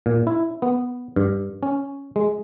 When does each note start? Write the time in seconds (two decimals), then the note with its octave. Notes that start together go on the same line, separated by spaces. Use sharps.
0.06 A#2
0.27 E4
0.62 B3
1.16 G2
1.63 C#4
2.16 G#3